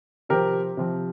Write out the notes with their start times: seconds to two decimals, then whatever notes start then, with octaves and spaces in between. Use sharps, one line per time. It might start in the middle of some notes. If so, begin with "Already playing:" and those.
0.29 C3 F3 C4 G4 A#4
0.77 C3 F3 C4